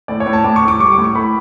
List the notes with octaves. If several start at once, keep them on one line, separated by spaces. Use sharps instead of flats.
A2 D5
C#5
A2
A5
A2 D6
C#6
A2
D6
G3 C#6
D6
A2
C#6
A2 B5